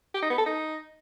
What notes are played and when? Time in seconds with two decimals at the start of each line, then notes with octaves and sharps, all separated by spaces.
0.14 G4
0.22 D#4
0.30 B3
0.38 A4
0.46 D#4